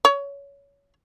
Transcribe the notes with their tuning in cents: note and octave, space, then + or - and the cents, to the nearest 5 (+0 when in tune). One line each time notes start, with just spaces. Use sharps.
C#5 +20